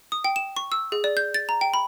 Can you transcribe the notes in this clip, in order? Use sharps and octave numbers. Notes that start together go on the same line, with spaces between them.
D#6
G5
E7
C#6
E6
G#4
D5
G6
A6
A#5
G5
B5